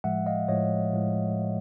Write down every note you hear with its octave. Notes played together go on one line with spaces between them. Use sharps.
A2 F3 G#3 E5 F#5
D#5 F5
A2 F3 G#3 C#5 D#5
A2 F3 G#3